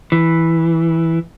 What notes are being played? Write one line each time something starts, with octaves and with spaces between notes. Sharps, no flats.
E3